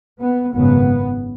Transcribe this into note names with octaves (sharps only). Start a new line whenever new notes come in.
B3
G#1 F#2 C#3 B3